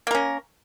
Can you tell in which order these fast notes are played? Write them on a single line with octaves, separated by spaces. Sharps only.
A#3 A#4 C#4